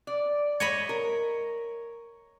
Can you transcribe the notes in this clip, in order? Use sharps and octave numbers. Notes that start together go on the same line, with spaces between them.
D5
C#5 D#5 B5
A#4